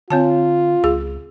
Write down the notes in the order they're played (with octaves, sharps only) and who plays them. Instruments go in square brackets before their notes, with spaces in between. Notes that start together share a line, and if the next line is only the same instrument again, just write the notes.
[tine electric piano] D3 [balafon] C4 C#5 A5 [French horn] F4
[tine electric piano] C#2 [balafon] G#4